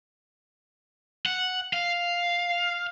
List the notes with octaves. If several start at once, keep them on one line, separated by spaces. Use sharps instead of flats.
F#5
F5